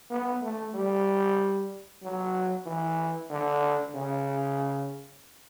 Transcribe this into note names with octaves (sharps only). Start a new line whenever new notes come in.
B3
A3
G3
F#3
E3
D3
C#3